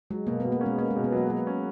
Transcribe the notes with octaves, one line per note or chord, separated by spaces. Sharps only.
F#3 G#3
B2 A#3
B2 B3
A#3
G#3 C#4
A#3 C#4
G#3
B2
B3
F#3 A#3
F#3 A#3
C#4